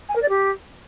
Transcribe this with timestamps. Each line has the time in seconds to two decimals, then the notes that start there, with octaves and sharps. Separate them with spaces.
0.09 G#5
0.15 A#4
0.22 D5
0.29 G4